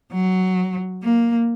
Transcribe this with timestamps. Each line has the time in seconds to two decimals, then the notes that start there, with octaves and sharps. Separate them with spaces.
0.13 F#3
1.03 A#3